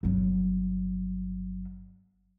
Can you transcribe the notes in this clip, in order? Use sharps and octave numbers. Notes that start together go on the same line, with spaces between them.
G1 F#3